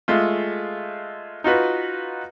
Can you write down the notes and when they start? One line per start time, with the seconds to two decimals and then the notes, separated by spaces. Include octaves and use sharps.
0.08 G#3 A3 F4
1.44 D#4 F4 F#4 B4